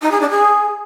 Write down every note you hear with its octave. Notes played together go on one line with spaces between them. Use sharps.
D#4
G#4
D4
G#4